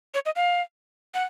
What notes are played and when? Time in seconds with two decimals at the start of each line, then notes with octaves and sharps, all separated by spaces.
0.14 C#5
0.26 D#5
0.36 F5
1.14 F#5